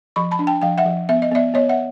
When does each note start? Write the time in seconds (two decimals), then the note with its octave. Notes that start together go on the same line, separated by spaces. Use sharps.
0.16 F3 B5 C#6
0.31 A5 B5
0.39 D4
0.47 G5 A5
0.62 F3 F5 G5
0.78 E5 F#5
0.86 F3
1.09 B3 E5
1.22 D#5
1.31 B3 D5 E5
1.54 B3 C#5 D#5
1.69 E5 F#5